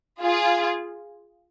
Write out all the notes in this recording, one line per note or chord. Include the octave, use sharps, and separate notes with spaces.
F4 G#4